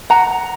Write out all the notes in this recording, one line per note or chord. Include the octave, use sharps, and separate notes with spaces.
F#5 A#5